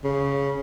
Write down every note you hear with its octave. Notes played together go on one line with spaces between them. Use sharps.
C#3